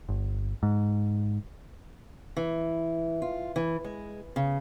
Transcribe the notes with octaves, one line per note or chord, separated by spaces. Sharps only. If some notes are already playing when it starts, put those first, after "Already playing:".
G1
G#2
E3
F4
E3
G#3
C#3